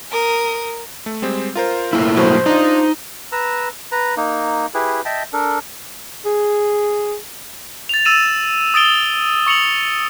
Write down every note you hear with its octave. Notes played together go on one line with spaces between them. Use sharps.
A#4 D#6
A3
G3 G#3 C4
F4 A#4 C5
A3 A#3 E4
G2 B2 F#3 C5
D4 D#4 F4
B4 A#5 E6
B4 A#5
A#3 D#4
E4 G4 G#4 B4
D#5 E5 G5 A5
D4 A4 A#4
G#4
A6 F7
E6 A6 D#7 E7
D#6 A6 D7 G7
C#6 C#7 F7 F#7